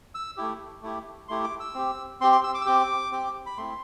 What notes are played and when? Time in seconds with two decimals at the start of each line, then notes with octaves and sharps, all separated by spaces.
0.15 E6
0.37 A3 E4 G4
0.83 A3 E4 G4
1.28 A3 E4 G4 C6
1.44 D6
1.60 E6
1.75 C4 G4
2.21 C4 C6
2.24 G4
2.32 C6
2.44 E6
2.54 D6
2.61 E6
2.66 C4 G4 D6
3.12 C4 G4
3.46 B5
3.58 A3 C4 E4 C6